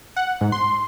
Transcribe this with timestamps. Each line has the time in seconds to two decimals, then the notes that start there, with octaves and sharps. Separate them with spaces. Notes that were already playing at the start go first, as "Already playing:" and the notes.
0.16 F#5
0.41 G#2
0.52 C6